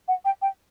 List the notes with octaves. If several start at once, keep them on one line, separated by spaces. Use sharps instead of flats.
F#5
G5
G5